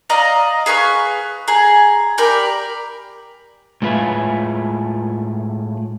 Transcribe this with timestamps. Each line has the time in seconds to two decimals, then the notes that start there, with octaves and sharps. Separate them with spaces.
0.10 D5 D#5 F5 A#5
0.66 G#4 B4 F5 C#6
1.48 G#4 A#5
2.18 G4 A#4 D5 B5
3.82 A2 G#3 F4 B4 E5 G#5